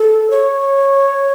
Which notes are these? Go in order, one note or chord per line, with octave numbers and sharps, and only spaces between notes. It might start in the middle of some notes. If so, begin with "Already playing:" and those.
Already playing: A4
C#5